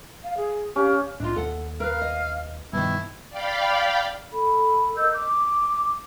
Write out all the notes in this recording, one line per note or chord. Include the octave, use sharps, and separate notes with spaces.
F5
G#4
C#4 G4 F5
C2 A2 D4 D#4 F4
D#2 A4 F#5
A#4 B4 F5
D#5
G2 B2 D#3 F3 G3 E4
D5 F5 G5 B5
A4 B5
A#4 D#5 E6 G6
D6